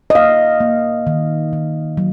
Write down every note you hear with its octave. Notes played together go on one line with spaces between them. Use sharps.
D#5
A#3 F5
A#3
D#3
D#3
F#3